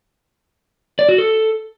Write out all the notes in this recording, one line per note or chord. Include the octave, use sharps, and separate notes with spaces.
D5
F#4
A4